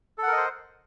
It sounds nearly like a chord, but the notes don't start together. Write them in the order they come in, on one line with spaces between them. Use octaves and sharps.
A4 F#5 A#4 D#5 C5